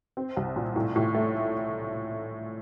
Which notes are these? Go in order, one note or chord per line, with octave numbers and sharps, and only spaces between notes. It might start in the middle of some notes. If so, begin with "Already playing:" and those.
C4
C2
A#2
A2
A2
A3